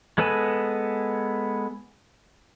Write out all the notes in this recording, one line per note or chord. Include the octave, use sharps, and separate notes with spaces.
G#3 B3 A4 B4 G#5